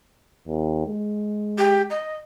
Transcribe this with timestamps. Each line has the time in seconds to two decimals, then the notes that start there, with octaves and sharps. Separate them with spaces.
0.48 D#2
0.87 G#3
1.58 G4
1.90 D#5